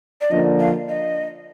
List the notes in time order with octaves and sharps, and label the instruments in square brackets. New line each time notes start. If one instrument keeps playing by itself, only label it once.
[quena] D5
[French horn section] D3 F3 A#3 D4 [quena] D#5
[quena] F5
D#5